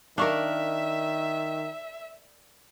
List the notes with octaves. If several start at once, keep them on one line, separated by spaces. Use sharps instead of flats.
D#3 D4 A#4 E5 F5 C#6